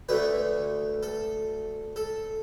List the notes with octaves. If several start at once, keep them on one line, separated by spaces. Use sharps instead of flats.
D2 D3 A3 B4
A4
A4